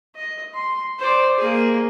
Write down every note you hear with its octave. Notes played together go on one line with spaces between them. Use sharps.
D#5
C6
C5 D5
A#3 G#4